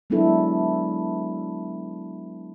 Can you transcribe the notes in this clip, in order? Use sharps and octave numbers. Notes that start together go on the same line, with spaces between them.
F#3 G#3 B3 D4 E4 A4